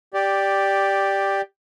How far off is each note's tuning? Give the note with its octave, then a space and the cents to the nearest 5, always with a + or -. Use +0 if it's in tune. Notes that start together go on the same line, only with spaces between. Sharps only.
G4 +5 D5 +0